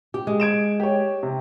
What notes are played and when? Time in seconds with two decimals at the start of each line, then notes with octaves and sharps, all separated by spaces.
0.14 G4
0.27 G#3
0.40 G#6 D7 E7
0.80 G4 C#5
1.23 C3